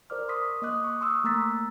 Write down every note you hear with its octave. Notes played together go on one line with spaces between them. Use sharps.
A#4 C5 D5 D6 F6
C6 C#6 D#6 B6
A#3 D#5 D6 D#6 F#6
C#6
C6 C#6 D#6 E6 F#6
A3 A#3 A#5 E6 A6 B6